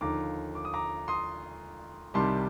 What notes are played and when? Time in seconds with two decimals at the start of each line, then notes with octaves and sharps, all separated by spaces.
0.01 D#2 D3 F3 A#5 D6
0.55 D6
0.65 D#6
0.74 A#5 D6
1.08 C6 D#6
2.14 C2 C3 D#3 G3 A5 C6